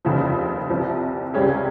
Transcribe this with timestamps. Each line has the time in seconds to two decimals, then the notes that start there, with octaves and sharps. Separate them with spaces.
0.05 F1 D#2 C#3 F3
0.69 C2 C3 F3
1.34 C#2 C3 G3 C#4 G#4